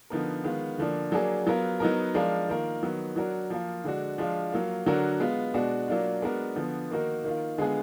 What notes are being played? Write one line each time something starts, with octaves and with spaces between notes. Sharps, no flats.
D3 F3 B3 D#4 A#4
D#3 G#3 B3 F4
D3 F3 A#3 D4
F#3 A#3 D4 G#4
F#3 B3 F4 A#4
F#3 B3 D#4 A#4
F3 G#3 D4 F4 A#4
D#3 A#3 F4 A#4
D#3 F#3 B3
F#3 D4 F#4 A#4
F3 A#3 F4 A#4
D3 G#3 D4 F#4
F3 G#3 D4 F4
F#3 A#3 F4
D3 F#3 D4 F#4 A#4
G#3 B3 F4
B2 G#3 D4 F#4
F#3 A#3 D4 F4
G#3 B3 D4 F#4 A#4
D3 F3 B3
D#3 A#3 D#4 F#4 A#4
D#3 A#3 F4
D3 G#3 B3 F4 G#4